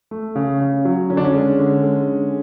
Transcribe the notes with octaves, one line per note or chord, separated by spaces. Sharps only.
A3
C#3
C#3
F#3
D3 C#4
D4
C#4
G#3
D3
G#3
D3